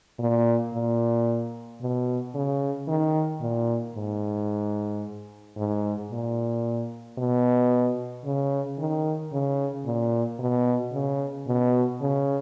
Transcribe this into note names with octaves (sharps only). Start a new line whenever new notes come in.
A#2
A#2
B2
C#3
D#3
A#2
G#2
G#2
A#2
B2
C#3
D#3
C#3
A#2
B2
C#3
B2
C#3